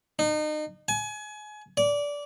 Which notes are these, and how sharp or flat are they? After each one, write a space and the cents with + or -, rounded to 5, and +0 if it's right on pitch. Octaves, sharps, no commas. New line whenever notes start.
D#4 -35
G#5 +30
D5 -20